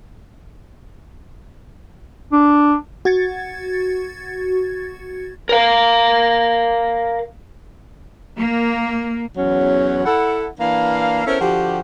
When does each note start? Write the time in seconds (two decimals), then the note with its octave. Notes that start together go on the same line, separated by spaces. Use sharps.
2.32 D4
3.05 F#4 G#6 A6 C#7
5.49 A#4 F5
8.39 A#3
9.37 E2 F#3 C#4
10.05 E4 A4 F#5
10.60 E3 A#3 D4 F5
11.26 B3 C#4 E4 A4 A#4 C5
11.40 D3 F3 F#4 G4